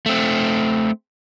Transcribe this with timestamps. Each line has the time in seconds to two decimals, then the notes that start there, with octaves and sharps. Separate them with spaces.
0.06 A3 C4